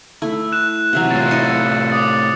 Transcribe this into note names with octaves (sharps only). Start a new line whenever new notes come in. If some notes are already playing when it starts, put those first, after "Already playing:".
A3 E4
F#6 E7
C3 E3 F#3
A2 F4 A6
E4 D#5 C#7
D6 D#6 A6